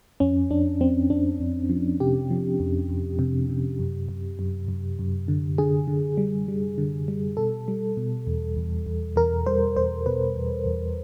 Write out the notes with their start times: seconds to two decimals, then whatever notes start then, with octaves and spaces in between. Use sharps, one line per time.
0.20 F2 C#4
0.50 F2 D4
0.81 F2 C4
1.10 F2 D4
1.40 F2
1.70 F3
2.00 C3 G4
2.30 F3
2.60 F2
2.89 F2
3.19 C3
3.49 C3
3.79 F#2
4.09 F#2
4.39 F#2
4.68 F#2
4.99 F#2
5.28 D3
5.58 D3 G#4
5.88 D3
6.18 G3
6.48 G3
6.78 D3
7.08 G3
7.37 B2 A4
7.68 G3
7.97 B2
8.27 E2
8.56 E2
8.86 E2
9.16 E2 A#4
9.46 G3 C5
9.77 E2 C5
10.06 B2 B4
10.36 E2
10.66 E2